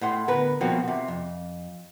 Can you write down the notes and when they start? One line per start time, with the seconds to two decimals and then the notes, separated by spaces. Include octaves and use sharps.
0.01 A2 F#5 C6
0.28 D2 B3 A#4 B4
0.61 C2 B2 F3 A#3 C4 F#4
0.88 C3
1.08 F2